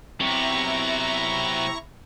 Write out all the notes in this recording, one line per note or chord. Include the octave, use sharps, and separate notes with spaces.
C3 F#3 B3 E4 A#5 C#6